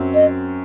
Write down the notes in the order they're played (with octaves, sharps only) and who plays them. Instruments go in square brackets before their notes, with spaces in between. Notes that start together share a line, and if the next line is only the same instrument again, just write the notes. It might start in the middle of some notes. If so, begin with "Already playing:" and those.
Already playing: [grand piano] F#2 F#3 C4
[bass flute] D#5